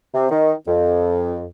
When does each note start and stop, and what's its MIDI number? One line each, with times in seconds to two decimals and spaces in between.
0.14 0.26 48
0.31 0.53 51
0.68 1.44 41